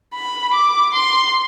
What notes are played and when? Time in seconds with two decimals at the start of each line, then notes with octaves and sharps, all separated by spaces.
0.14 B5
0.53 D6
0.94 C6